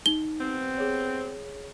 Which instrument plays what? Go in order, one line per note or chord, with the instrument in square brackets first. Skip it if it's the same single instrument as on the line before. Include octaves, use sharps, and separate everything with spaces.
[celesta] D#4 [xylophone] G7
[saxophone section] G3 B3 C4
[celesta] G#4 C#5